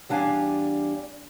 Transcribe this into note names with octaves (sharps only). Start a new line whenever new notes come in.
E2 G3 D4 F5 G#5